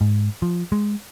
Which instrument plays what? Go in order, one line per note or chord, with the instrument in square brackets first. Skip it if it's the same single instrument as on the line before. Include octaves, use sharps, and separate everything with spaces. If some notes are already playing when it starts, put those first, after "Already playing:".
[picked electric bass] G#2
F3
G#3